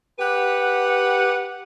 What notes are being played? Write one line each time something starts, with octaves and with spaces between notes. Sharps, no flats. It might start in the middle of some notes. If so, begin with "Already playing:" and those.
G4 B4 F#5